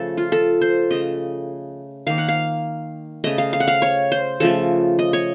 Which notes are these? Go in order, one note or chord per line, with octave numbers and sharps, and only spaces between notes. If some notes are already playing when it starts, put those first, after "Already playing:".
Already playing: C#3 F3 A3 A4
F4
A4
C5
C#3 A3 D#5
D#3 A#3 F5
F#5
F5
C#3 A3 D#5
F5
F5
F#5
F5
C#5
C5
C#3 F3 A3 A4
D#5
C#5